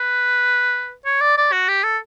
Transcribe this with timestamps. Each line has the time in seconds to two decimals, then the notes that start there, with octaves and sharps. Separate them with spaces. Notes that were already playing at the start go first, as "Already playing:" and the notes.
Already playing: B4
1.06 C#5
1.21 D5
1.38 D5
1.52 F#4
1.68 G4
1.84 A4